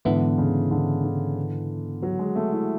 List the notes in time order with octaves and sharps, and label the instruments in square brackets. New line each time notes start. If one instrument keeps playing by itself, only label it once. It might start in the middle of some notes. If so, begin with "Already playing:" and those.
[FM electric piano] G#2 E3 B3 E4 [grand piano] D3
[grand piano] C#3
D3
D3
F#3
G#3
A3
E4